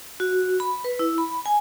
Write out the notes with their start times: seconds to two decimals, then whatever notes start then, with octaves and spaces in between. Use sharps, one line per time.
0.20 F#4
0.60 B5
0.84 B4
0.99 E4
1.18 B5
1.46 G#5